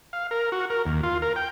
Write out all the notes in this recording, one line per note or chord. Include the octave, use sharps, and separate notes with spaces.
F5
A#4
F#4
A#4
D#2
F4
A#4
G5